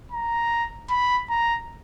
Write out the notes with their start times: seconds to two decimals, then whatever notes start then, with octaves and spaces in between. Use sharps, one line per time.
0.12 A#5
0.90 B5
1.30 A#5